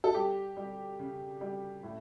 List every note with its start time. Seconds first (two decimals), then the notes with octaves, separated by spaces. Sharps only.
0.04 A4
0.14 G3 G4
0.57 G3
0.99 C#3
1.41 G3
1.83 A2